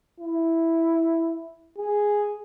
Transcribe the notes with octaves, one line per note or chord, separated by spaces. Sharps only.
E4
G#4